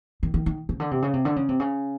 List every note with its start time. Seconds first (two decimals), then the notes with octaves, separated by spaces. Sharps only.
0.23 D#3
0.34 D#3
0.46 D#3
0.69 C#3
0.80 D3
0.91 C3
1.02 C#3
1.14 C3
1.25 D3
1.36 C#3
1.49 C3
1.60 C#3